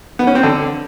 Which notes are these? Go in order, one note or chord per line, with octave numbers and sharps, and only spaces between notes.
B3
C#4
C4
D3